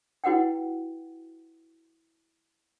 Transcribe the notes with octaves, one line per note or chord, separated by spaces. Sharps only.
E4 F#4 B4 F#5 G5